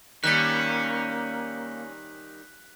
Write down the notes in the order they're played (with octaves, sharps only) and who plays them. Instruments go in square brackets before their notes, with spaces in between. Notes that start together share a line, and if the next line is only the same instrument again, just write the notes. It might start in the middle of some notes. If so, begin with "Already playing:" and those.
[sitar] D#3 G3 [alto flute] A#3 [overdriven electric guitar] C#4 [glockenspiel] F#6 B6